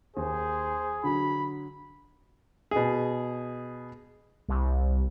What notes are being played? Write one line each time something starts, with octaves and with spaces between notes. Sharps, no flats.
D#2 G#4 C5
D3 F#3 B5
B2 G#4
C2